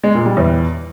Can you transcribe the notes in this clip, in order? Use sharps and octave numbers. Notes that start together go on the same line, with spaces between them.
G#3
A#2
G3
E2